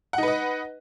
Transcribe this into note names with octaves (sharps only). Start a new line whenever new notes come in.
D#4 B4 D#5 F#5